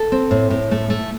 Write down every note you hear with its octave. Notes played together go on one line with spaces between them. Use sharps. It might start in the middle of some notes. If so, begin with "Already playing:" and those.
Already playing: A4
C4
A2
A2
A3
A3